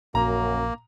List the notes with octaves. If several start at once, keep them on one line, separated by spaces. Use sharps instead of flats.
A#1 F#2 A#3 A#5